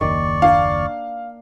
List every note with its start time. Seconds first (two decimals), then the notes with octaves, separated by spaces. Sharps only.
0.01 F#1 D#2 D#3 D5 C#6
0.42 A#3 D4 F5